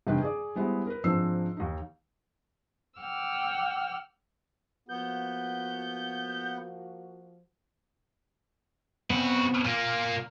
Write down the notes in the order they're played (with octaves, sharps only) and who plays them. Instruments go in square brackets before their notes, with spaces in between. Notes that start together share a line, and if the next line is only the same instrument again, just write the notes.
[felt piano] F1 G2 D#3 B4 G5
G#4 D5
G3 G#3 B3 E4 C5
A#4 B4
G#2 F3 C4 D4 E6 C7
D#2 D#4
[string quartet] F#5 G5 D6 E6 F6
[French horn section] F3 A#3 F#4 [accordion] B3 [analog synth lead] G6
[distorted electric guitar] C#3 F#4 [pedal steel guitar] B3 C4
[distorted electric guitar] A#2 A#3 [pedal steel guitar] F6